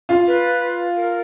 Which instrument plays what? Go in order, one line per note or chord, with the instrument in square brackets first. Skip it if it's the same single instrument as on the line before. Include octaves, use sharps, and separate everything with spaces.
[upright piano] F4
[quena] B4
A#4